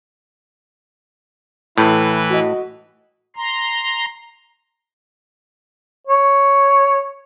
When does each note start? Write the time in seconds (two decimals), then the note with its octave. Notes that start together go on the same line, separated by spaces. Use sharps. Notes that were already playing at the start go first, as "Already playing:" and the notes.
1.78 A2 E3 B4
2.29 F#4 D#5
3.36 A#5 C6
6.07 C#5